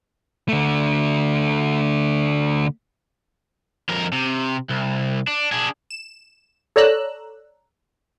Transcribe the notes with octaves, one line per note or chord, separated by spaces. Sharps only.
D3 A3
F2 A#4
C3
C2
D4
D4 G#4
E7
A4 C#5 D5 A#5 E6 F#6